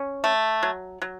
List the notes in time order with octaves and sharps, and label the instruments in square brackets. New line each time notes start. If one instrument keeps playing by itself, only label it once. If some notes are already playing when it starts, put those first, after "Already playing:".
Already playing: [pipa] C#4
A3
F#3
F#3